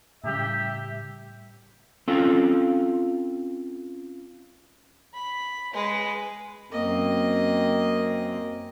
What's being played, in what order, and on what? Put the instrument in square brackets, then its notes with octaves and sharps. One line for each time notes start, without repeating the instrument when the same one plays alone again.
[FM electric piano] A2 C#3 G3 [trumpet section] G4 E5
[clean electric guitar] C4 C#4 F4 A4 F5 G5
[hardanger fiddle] B5
G#3 B4
[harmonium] F#2 C4 [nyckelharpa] A#3 D#5